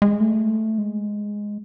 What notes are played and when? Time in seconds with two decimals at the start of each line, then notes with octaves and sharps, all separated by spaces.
0.02 G#3
0.21 A3
0.78 G#3